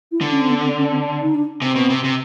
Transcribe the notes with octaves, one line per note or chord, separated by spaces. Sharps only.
E4
D3
C#4
C4
B3
C4
C#4
C4
D#4
D4
C3 C4
B2
C3
C3